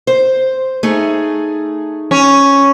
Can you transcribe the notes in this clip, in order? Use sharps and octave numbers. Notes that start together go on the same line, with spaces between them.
C5
A3 D#4 G#4
C#4